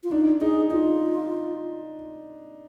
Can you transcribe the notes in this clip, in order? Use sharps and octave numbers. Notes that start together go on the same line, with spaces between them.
F4
D4 D#4
D#4 G#4
D#4 F4